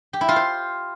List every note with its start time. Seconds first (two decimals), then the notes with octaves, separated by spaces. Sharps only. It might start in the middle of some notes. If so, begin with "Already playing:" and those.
0.13 G4
0.21 E4
0.29 F4
0.36 C5